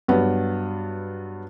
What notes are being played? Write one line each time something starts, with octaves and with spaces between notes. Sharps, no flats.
G2 F#3 B3